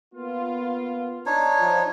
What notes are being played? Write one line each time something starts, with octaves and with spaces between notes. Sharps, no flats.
A#3 B3 F4
D4 D#4 C#5
F3